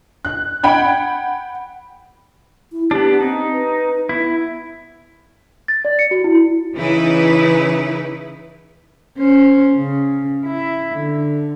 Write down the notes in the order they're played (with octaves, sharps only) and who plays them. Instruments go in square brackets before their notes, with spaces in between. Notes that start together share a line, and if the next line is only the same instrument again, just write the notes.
[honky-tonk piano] F#6
F#5 G5 B5 G#6
[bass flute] E4
[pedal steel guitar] B3 D4 [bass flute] G4
[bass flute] C4 [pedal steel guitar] D#4
[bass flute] B4
[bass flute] B3 [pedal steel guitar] E4
[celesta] A6
D5
C#7
F#4
E4
[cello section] C#3 E3 D#4 E4 B4
[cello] C#4 C5
C#3
E4
D3